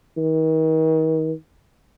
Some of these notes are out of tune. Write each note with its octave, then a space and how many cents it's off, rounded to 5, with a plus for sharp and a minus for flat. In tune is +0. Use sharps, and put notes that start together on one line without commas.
D#3 +40